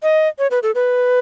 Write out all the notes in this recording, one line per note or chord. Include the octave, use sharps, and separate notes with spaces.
D#5
C#5
B4
A4
B4